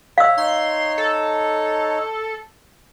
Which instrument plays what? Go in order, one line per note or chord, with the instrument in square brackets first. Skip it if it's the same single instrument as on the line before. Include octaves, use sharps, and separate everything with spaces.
[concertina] C#5 [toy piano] F5 E6
[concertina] D#4 C#5 [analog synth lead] C6
[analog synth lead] A4